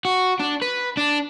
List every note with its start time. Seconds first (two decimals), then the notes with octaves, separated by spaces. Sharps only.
0.05 F#4
0.39 D4
0.62 B4
0.97 D4